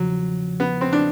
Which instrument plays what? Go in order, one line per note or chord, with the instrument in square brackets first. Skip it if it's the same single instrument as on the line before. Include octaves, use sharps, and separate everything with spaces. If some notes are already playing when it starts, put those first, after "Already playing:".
Already playing: [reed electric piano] E2 C#3 F3 [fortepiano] F#3
[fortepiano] B3
C4
D4